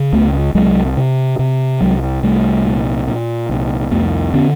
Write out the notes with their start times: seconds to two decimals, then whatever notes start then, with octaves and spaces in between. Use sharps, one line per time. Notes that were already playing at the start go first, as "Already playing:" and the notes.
Already playing: C#3
0.13 C#2 A3 B3
0.54 C2 F#3 G#3
0.97 C3
1.39 C3
1.81 C2 F#3 G#3
2.23 C2 G3 A3
2.65 A#2
3.07 A#2
3.49 C2
3.91 F2 A3 B3
4.34 D3 B3 C#4